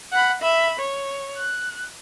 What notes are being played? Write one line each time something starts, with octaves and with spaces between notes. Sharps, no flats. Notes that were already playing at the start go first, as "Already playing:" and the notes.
F#5 B5
E5 B5
C#5
F#6